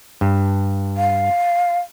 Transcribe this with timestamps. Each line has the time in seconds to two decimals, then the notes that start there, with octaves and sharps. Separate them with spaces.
0.21 G2
0.97 F5